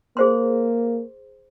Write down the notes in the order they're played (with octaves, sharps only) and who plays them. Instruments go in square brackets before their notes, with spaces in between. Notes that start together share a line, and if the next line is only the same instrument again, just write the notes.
[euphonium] A#3 [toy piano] G#4 C5 C6